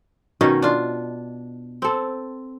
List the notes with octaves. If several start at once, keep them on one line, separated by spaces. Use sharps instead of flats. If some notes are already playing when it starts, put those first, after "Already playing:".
B2 D#3 C#4 D#4
D4 F4
C4 A4